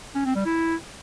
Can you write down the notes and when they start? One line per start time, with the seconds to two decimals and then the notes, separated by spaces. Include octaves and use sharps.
0.15 C#4
0.25 C4
0.35 G3
0.46 E4